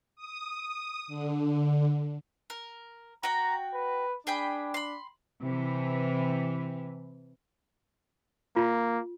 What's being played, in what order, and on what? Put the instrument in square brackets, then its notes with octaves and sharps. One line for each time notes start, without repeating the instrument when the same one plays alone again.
[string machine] D#6
D3
[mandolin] A#4
[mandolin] F#4 G5 [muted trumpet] A#5
[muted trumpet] B4
[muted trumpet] D4 [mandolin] G#4 G5 B5
[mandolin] B5 C6
[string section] C3 E3
[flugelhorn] A#3 [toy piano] F4